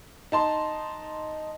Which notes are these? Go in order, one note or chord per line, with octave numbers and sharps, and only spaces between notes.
D#4 A5 C6